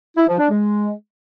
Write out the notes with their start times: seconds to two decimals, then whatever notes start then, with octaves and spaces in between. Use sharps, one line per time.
0.17 E4
0.28 F3
0.39 D4
0.50 G#3